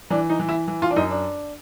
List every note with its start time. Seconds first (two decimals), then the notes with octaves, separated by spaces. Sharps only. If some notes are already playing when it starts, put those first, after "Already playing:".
0.10 E3 D4
0.30 D#4
0.39 E3
0.49 E4
0.68 E3
0.82 F4
0.91 D4
0.96 F#2 D#4
1.11 D4